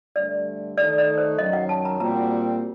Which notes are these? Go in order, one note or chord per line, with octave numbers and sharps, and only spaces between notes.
G2 D3 A3 D5
D#3 A3 D#4 A4 D5
D5
C5
F#2 D#3 F#3 D#5
F#5
A5
A#5
A#2 G3 C4 F#4 A#5